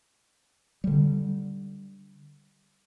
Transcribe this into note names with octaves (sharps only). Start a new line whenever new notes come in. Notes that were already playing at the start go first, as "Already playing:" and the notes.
D3 G3